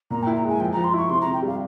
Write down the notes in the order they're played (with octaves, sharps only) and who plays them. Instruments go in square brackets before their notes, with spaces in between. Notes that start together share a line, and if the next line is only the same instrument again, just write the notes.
[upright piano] A#2 [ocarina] A#5
[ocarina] G5
[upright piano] E4
[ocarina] A#5
[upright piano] G#3 [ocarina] G#5
[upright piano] F3 [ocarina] G5
[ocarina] A#5
[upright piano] F3
[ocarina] C6
[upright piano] E4 [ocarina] C#6
[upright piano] C3 [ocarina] C6
[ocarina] A#5
[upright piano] C3
[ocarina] G5
[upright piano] G3 [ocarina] F5